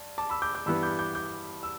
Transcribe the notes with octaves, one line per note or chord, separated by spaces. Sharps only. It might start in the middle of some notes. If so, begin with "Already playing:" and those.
Already playing: G2
A5 D6
B5 E6
D6 G6
D6 G6
G2 E3 G3 B3 B5 E6
D6 G6
D6 G6
D6 G6
E6